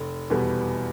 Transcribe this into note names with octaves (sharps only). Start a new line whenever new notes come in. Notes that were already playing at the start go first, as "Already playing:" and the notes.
Already playing: F1
E2 B2 G3 B3